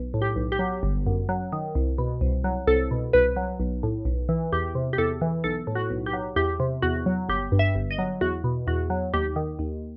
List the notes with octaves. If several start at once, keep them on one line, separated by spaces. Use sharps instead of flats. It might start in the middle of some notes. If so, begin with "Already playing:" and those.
Already playing: B1
A2
G4
B1
G4
F#3
G1
F#2
F#3
D#3
C2
B2
C2
F#3
C2 A4
B2
C2 B4
F#3
B1
A2
B1
E3
E2 G4
C3
G4
E2 A4
E3
B1 A4
A2
F#4
B1
G4
F#3
E2 G4
C3
E2 F#4
F#3
G1 G4
G2
E5
G1
D#5
F#3
E2 F#4
B2
E2 F#4
F#3
D#2 G4
D#3
D#2